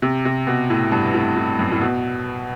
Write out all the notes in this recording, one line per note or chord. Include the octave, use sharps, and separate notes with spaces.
C3
C3
B2
A2
G2
A2
A2
F#2
A2
B2